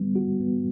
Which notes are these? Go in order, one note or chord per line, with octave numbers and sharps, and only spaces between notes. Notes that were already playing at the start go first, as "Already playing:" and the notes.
Already playing: D3 G3 B3
F#4
B3